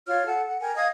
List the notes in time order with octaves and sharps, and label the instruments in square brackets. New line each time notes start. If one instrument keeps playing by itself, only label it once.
[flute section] F4 C#5 F6
A4 F#5
F#5
A#4 G5 G#5
D#5 F5 D#6 G#6